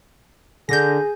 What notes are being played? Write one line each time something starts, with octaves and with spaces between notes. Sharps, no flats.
D3 G#4 G6 A#6